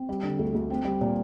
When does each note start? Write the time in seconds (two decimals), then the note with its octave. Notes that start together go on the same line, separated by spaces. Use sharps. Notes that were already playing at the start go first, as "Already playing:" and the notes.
Already playing: C4
0.09 G3
0.23 D3
0.39 D2
0.54 D2
0.70 C4
0.85 G3
1.01 A#2